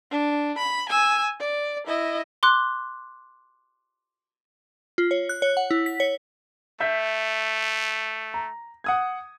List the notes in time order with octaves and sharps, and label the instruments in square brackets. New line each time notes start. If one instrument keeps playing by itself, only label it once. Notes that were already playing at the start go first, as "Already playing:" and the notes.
[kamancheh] D4
B5
G#5 E6
D5
E4 D#5
[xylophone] C6 D6 F#6
[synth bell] F4
C#5
F#6
C#5
F#5
E4
B6
C#5
[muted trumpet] A3 [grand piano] E5 G6 B6
[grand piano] A#5
F#5 D#6 G#6